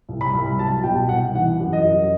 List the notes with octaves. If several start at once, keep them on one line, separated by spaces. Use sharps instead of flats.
C2
B5
C2
F#3 A5
B2 G5
C2 F#5
E3 F#5
F#2
D#5
F#2